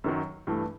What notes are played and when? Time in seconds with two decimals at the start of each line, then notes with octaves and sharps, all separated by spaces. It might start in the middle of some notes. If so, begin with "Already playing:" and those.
0.04 F#2 D#3 F#3
0.47 G2 E3 A3